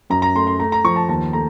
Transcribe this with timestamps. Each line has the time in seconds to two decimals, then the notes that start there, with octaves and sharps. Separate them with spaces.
0.10 F#2 A#5
0.22 A#5
0.35 A3 C6
0.47 C6
0.59 A3 A#5
0.72 A#5
0.84 F3 C#6
0.96 A5
1.09 D#2 A5
1.33 A3 A#5